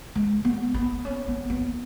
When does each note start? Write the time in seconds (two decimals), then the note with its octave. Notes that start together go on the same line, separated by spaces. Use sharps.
0.15 G#3
0.45 B3
0.74 B3
1.05 C#4
1.28 B3
1.50 B3